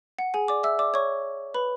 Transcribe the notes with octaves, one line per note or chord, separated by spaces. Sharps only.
F#5
G#4 G#5
D5 D6
E5 E6
D5 D6
C#5 C#6
B4 B5